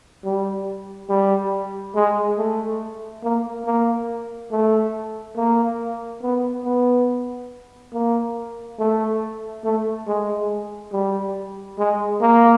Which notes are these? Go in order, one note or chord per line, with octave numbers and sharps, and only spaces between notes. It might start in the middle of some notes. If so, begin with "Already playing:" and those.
G3
G3
G#3
A3
A#3
A#3
A3
A#3
B3
B3
A#3
A3
A3
G#3
G3
G#3
A#3